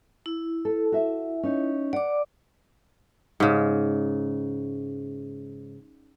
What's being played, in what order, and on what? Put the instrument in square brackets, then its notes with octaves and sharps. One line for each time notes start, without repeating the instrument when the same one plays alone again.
[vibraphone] E4
[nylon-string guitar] A4
F#4 E5
C#4 D#4
[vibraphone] D5 D6 [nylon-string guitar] F#5
[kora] G#2 C#3